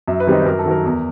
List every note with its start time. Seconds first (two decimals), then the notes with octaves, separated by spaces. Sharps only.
0.08 F#2 E5
0.20 B4
0.27 D#3 G3 C4 D#4
0.46 F#2 A#4
0.59 A4
0.66 D#3 F#3 A#4
0.85 E2